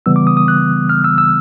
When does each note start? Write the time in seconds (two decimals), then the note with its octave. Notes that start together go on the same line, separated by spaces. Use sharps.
0.06 C#3 E3 G3 B3 E6
0.16 D6
0.27 D#6
0.37 D#6
0.48 F#6
0.89 F6
1.04 E6
1.18 E6